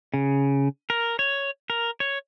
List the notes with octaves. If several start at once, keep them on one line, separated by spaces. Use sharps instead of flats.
C#3
A#4
C#5
A#4
C#5